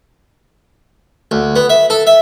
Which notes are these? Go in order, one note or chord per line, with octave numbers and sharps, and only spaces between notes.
D2
B3
E5
A4
E5